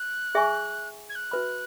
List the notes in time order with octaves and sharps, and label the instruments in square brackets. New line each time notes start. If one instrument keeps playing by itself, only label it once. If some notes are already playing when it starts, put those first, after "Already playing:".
Already playing: [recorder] F#6
[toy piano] G#4 E5 G#5 C#6
[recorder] G#6
F#6
[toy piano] F#4 B4 E5 B5